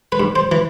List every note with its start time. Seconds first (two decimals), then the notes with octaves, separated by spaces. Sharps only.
0.12 B4
0.20 G2
0.36 C5
0.52 E3